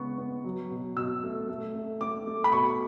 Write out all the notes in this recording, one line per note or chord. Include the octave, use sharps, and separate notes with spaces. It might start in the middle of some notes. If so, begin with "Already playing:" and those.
Already playing: C#3 G#3 B3 C#6
B3
F#3
B2
B2 E6
A3
A3
A3
A3 D6
A3
B5
B2 C#6